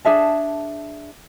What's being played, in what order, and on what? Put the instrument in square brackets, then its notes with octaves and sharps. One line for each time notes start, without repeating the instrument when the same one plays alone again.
[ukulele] D4 G#4 E5 A5